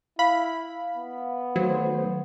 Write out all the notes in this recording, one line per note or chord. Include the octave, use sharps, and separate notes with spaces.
E4 F5 B5
B3
D#3 F#3 A3 C5